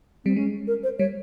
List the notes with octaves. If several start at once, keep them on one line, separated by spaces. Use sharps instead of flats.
G3 C4
G#3 C#4
A#4
C5
G3 C#5